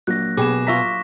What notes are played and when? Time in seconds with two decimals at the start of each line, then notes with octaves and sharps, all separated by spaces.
0.07 A#1 F#3 A#3 F#6 A#6
0.37 B2 G4 G#4 B4 D6 E7
0.67 F4 E5 A#5 C#6 A#6 B6